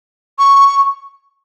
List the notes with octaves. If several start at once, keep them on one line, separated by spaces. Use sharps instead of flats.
C#6